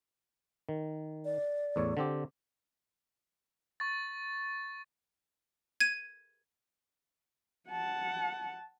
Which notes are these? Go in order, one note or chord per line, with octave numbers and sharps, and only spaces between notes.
D#3
D5
E2 A2 C#5
D3 C4 G4
C#6 A6
G#6 D#7
F#5 A5